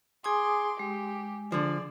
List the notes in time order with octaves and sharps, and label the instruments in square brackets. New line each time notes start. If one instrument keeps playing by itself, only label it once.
[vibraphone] G#4 G#5 D#6 [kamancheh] C6 D6
[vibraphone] G#3 [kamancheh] G4
[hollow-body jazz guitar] D3 F3 [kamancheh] G#4 D5